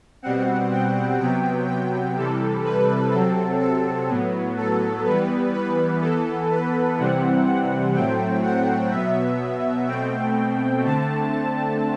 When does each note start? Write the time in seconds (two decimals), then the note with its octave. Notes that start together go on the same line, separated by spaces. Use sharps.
0.22 B2 G3 C4 F#5
0.71 G5
1.20 C3 F#3 B3 G5
1.68 G5
2.16 C3 E3 G3 A4
2.64 B4
3.12 C3 F#3 C4 A4
3.60 A4
4.09 A2 F#3 B3
4.57 A4
5.05 E3 G3 B3 B4
5.54 B4
6.01 E3 B3 A4
6.51 B4
6.98 C3 E3 G3 C4 F#5
7.46 F#5
7.94 A2 F#3 A3 C4 G5
8.42 F#5
8.91 B2 F#3 B3 E5
9.88 B2 A3 C4 G5
10.84 D3 A3 C4 A5
11.33 A5